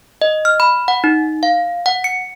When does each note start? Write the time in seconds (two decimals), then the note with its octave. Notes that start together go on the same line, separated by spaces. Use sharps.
0.22 D#5
0.45 F6
0.60 B5
0.88 F#5
1.04 D#4
1.43 F5
1.86 F#5
2.04 C#7